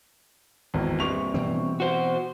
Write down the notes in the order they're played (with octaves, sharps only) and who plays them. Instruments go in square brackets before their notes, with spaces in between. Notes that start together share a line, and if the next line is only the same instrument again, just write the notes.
[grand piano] G#1 E2 D#3
[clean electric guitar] G2 C3 [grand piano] C#6 F7
[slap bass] B2 E3 C4
[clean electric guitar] F#4 C5